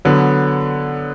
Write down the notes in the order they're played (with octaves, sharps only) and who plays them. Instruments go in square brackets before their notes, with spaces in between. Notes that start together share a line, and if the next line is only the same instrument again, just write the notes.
[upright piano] D3 F#3 B3